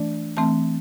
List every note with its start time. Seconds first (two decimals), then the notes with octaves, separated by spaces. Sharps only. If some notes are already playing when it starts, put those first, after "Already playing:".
Already playing: E3 A3 D4 D5
0.37 E3 A3 C4 A5